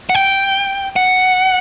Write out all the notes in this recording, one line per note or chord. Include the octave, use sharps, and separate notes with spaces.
F#5
G5
F#5